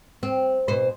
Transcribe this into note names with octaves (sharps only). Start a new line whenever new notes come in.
C4
B2 C5